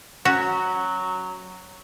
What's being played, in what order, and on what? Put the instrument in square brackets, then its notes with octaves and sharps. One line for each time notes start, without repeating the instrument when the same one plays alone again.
[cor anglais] F#3 [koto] C#4 F#4